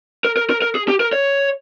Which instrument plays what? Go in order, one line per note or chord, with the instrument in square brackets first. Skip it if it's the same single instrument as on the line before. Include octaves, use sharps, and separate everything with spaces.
[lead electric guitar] A#4
A#4
A#4
A#4
G#4
G4
A#4
C#5